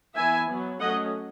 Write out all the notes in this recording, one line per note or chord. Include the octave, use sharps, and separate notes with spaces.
E3 B3 E5 G#5
F#3 B3
F#3 A3 C#4 D#5 F#5